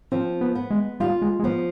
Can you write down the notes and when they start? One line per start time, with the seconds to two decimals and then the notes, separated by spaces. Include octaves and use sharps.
0.12 F3 C4
0.41 B3
0.55 B3
0.71 G#3
1.00 G3 F4
1.22 G#3
1.39 G#3
1.43 F3 B3